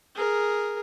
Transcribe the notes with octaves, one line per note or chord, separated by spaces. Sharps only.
G#4 A#4